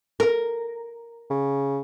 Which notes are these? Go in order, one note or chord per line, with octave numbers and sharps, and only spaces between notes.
A#4
C#3